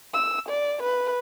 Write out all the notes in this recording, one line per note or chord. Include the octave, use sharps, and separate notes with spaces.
E6
D5
B4